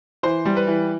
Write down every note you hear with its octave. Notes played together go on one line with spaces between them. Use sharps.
E3 C5
G3
B4
E3